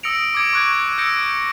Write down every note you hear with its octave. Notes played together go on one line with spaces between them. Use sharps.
D#6 E6 A#6 C#7 D7 F7
D6 G#6 D7
C#6 F#6 G#6
E6 G6 A#6 C#7 D7